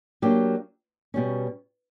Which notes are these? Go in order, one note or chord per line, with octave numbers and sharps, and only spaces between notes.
F#3 A#3 D4 G4
B2 G3 C#4